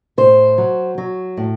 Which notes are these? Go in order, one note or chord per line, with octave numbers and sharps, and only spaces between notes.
A2 C5
F#3
F#3
A2